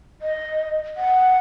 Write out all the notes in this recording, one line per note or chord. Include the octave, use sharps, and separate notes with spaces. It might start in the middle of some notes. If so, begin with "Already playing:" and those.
D#5
F#5